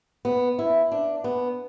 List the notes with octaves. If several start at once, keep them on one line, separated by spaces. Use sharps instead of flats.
B3
E4
D4
B3